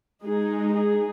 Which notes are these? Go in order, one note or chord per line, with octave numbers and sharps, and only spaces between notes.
G#3 D#4 G#4
G#4